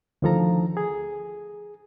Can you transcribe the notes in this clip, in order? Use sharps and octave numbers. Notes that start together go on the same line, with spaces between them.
D2 D#3 F3 A4 A#5
G#4